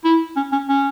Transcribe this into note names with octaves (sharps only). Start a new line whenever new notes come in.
E4
C#4
C#4
C#4